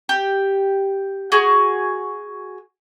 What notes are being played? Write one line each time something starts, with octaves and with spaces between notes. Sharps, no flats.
G4
F#4 G#4